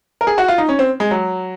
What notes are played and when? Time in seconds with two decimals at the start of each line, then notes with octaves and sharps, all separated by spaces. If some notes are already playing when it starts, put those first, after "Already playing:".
0.21 A#4
0.27 G#4
0.38 F#4
0.48 F4
0.58 D#4
0.69 C#4
0.79 C4
1.00 G#3
1.11 F#3